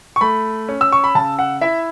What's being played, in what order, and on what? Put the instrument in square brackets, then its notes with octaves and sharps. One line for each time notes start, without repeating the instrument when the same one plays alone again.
[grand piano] C#6
A3 B5
C#4
E6
C#6
B5
C#3 A5
F#5
E4 E5